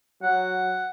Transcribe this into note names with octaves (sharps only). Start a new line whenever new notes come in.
F#3 F#5